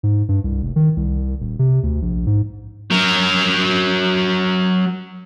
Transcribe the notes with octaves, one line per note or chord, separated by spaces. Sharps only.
G#2
G2
C2
F1
D#3
C2
D#1
C3
D2
A#1
G#2
F#3 A#4